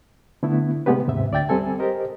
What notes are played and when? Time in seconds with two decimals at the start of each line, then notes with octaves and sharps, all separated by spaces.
0.43 D3 A3 B3 E4
0.86 C3 G#3 A#3 B3 G4 B4
1.07 D#2 G#2 C3 E5
1.32 D2 D5 E5 G5 A6
1.49 G3 C4 A4 G#5
1.79 G4 A#4 C5 D#5